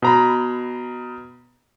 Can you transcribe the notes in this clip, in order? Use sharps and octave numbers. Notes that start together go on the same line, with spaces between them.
B2 A#5 B5